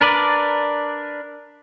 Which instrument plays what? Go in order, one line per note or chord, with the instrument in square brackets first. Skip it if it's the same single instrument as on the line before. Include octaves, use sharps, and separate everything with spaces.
[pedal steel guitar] D4 A#4 B4 D5